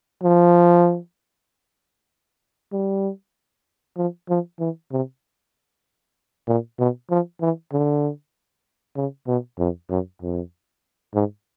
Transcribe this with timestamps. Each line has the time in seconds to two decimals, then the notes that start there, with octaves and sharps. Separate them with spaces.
0.23 F3
2.72 G3
3.97 F3
4.29 F3
4.59 E3
4.92 C3
6.48 A#2
6.79 B2
7.10 F3
7.41 E3
7.72 D3
8.96 C#3
9.27 B2
9.59 F2
9.90 F#2
10.22 F2
11.15 G#2